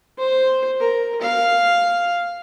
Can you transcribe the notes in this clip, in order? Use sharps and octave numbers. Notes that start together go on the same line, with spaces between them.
C5
A#4
F5